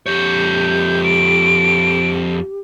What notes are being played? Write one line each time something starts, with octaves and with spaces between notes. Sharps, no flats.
F2 G4 C#5 G6
D7